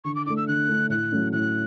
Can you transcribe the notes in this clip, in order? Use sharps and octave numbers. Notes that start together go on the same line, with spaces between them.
D3 C#6
D6
A3 D4 D6
E6
D3 F#6
A3 D4
A2 F#6
F#3 A3 C#4
A2 F#6